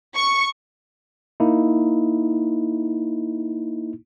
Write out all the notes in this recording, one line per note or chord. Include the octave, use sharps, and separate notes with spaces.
C#6
A#3 D#4 E4